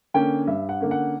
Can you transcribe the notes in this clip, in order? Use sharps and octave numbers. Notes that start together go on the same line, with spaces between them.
D3 A#3 C#4 G5
G2 E5
F#5
D3 A#3 C#4
F#5